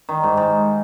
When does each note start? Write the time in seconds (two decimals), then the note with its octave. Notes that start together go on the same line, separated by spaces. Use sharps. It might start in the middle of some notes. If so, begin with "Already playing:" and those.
0.09 D#3
0.23 G#2
0.37 G#2